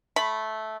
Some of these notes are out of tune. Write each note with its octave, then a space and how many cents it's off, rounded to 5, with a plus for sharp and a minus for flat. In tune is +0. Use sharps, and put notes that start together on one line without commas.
A3 -10 B5 +0